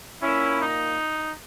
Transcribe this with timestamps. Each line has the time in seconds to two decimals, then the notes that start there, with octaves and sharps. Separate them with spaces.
0.22 A#2 A#3 C#4 E4
0.61 D#4